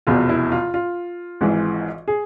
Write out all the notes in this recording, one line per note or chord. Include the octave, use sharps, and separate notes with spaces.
F1 E2 B2 F4
E4
F4
F4
G#1 G#2 E3
G#4